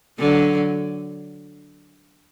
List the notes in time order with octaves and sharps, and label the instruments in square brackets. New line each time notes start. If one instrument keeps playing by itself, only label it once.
[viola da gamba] D3 F#3